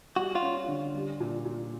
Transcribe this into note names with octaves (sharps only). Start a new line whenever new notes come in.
G3 F#4
F4
C#4
D3
G3
A#2
A#2